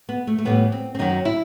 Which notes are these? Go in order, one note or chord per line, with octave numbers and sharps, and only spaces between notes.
B3
A3
A3
A2 E3 G3 B3
C4
C4
F#2 D#3 F#3 D#4
E4